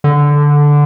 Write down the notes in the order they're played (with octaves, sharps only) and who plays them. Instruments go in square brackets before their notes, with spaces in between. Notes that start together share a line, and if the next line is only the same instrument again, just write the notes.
[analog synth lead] D3